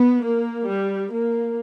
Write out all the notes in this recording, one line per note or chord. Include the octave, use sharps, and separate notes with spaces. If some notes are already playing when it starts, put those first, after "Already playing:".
Already playing: B3
A#3
G3
A#3